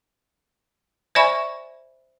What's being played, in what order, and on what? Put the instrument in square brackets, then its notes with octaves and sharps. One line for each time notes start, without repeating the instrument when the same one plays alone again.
[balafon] C5 D5 E5 G#5 B5 C#6